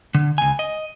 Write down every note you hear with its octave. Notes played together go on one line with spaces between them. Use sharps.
D3
C#2 G#5
D#5